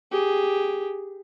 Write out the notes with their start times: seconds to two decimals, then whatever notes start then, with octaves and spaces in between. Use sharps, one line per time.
0.12 G4 G#4